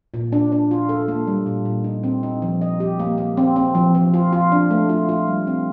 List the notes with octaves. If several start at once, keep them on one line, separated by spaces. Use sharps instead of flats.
A#2
D4
D4
F4
A4
A#3
G3
A#2
A#2
D#4
C4
D#4
F3
D#5
G4
A#3
A#3
C4
C4
F3
F3
F4
F4
D4
A3
F4
F4
G3
C4